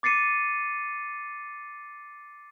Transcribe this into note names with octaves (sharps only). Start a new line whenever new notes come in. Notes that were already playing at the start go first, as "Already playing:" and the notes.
D6 A6 C7 C#7 D#7